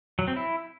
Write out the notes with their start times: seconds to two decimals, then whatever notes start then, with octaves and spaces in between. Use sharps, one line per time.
0.19 F#3
0.28 C4
0.36 E4